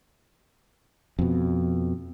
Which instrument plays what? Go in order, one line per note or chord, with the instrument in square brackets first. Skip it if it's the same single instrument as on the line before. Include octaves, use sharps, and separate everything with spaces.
[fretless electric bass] F2 B2